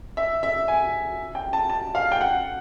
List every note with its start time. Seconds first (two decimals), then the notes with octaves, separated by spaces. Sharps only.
0.17 E5
0.43 E5
0.68 G#5
1.35 G5
1.53 A5
1.70 A5
1.95 F5
2.12 G5
2.21 F#5